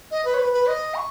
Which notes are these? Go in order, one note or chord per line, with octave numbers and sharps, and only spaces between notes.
D#5
B4
C#5
B4
B4
D#5
C#6